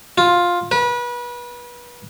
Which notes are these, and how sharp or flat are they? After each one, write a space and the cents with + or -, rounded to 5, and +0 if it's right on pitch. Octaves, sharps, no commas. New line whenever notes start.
F4 +10
B4 -30